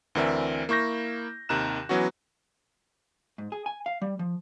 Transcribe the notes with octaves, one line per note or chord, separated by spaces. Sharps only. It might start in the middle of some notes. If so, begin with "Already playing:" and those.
D2 E3 C4 A#4 D5 E5
A#3 E4 C#6 G6 A#6
D#2 C3 D#3 A#5 F#6 E7
E3 F#3 B3 C#4 F#4
G#2
G#4
G#5
F5
G3
F3